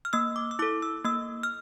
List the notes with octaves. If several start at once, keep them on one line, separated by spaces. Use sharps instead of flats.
F6
A#3 E6
D6
E6
E4 A4 D6
E6
A#3 E6
F6